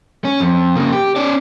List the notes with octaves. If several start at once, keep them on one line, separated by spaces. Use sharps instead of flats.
C#4
F2
C#3 A#3
G4
C#4 D5